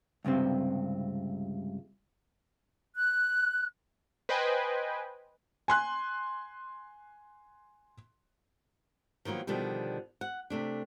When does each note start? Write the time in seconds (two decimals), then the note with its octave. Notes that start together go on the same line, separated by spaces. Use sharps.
0.25 C#2 G2 C3 C4
2.96 F#6
4.29 B4 C5 D#5 G5 G#5
5.68 G#5 C6 F#6
9.25 D#3 F3 F#3 A#3 B3
9.47 B2 D3 D#3 F3 G3
10.21 F#5
10.50 C3 A3 D4